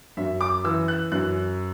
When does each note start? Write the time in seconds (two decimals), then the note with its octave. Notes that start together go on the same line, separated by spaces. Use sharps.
0.17 F#2 E5
0.41 D6
0.64 E3 E6
0.88 F#6
1.12 F#2 F#6